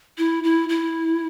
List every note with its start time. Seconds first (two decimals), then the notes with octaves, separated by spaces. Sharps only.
0.18 E4
0.44 E4
0.69 E4